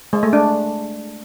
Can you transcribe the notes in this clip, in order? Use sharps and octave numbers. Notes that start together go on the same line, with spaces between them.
G#3
A3
D4